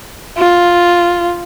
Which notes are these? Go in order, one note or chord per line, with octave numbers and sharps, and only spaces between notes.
F4